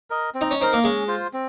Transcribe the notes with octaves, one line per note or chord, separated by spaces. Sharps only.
A#4 D#5
C4
D#4
C#4
C4 D#4 A#4
A#3
G#3 C#4
F4 C5
C4